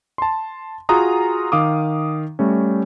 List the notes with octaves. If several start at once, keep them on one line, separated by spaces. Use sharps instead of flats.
A5 C6
F4 F#4 G#4 F#5 A#5 D#6
D#3 F5 D6 D#6
G3 A3 C#4